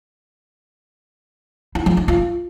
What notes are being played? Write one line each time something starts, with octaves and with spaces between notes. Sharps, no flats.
E4
F3
D#4
F4